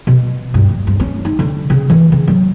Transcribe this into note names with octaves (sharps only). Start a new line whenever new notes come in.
B2
G2
D1
G2
C#4
D#4
D3
C#3
E3
C#3
F#3